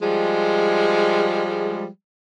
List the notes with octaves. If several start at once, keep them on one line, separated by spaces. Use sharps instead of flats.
F3 G3 G#3